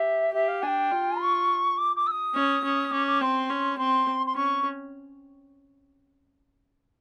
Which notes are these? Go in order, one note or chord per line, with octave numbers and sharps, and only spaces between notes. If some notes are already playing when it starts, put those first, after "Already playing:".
Already playing: G4 E5
G4 E5
F5
D4 G5 G#5
F4
C#6
D6
D6
E6
D#6
C#4
C#4
C#4 D6
D6
C4 C6
C#4
C4 C6
C6
C#4 C#6